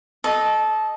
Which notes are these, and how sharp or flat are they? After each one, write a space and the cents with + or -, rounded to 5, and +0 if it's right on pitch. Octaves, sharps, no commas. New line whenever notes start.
A4 -20 D#5 +0